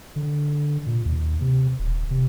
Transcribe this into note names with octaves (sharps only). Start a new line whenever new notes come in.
D3
A#2
D#2
C3
D#1
C3